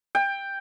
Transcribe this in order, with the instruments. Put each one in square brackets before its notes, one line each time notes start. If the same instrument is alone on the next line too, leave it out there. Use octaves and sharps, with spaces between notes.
[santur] G5